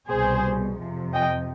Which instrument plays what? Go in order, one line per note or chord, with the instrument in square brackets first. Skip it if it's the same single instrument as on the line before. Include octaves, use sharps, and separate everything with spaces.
[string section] C2 B2 G3 G#4 C5
F2 C3 F3
D#5 G5